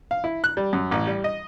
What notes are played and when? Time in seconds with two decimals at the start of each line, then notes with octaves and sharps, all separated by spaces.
0.11 F5
0.24 E4
0.44 F#6
0.57 G3
0.73 F#2
0.91 A1
1.07 G3
1.24 D#5